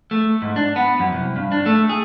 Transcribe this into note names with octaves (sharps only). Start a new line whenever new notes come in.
A3
G#2
D4
B3
F#2
C2
G2
D4
A3
G#4